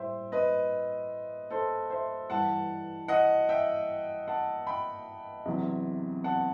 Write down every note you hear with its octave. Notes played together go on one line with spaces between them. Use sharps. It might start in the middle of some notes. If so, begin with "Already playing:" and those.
Already playing: A2 G3 C5 E5 G5
B4 D#5
A4 C5
C5 E5
G2 E3 G3 F#5 A5
D#5 F#5
E5 G5
F#5 A5
G5 B5
E2 C3 F#3
F#5 A5